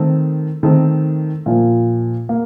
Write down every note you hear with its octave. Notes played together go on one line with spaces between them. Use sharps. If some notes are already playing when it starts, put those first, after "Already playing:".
Already playing: D#3 A3 C4
D#3 A3 C4
A#2 F3 A#3
A#3